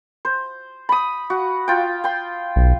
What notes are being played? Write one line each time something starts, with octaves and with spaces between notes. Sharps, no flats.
C5
B5 D#6
F#4
F4 G5
G5 C6
B1